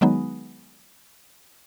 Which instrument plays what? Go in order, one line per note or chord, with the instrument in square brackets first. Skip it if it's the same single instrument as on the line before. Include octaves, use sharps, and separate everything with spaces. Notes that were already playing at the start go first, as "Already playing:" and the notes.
[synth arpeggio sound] D#3 F#3 G#3 B3 D#4